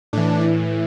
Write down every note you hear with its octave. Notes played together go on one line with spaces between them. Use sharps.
A2 E3 D4